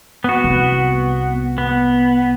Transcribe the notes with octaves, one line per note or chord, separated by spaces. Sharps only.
B3 F#4
C2
B3